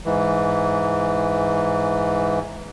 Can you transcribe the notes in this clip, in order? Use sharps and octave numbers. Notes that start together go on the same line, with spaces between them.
G#2 E3